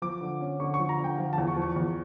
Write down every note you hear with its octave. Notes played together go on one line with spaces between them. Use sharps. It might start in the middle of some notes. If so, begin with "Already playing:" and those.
F3 D6
D3
C#4
D3 C#6
C#6
F3
A#5
D3
G5
F3 F5
A5
E2
C#6
F3
C#6
E2